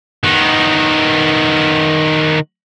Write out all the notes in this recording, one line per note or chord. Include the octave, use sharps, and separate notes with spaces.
D#3 B3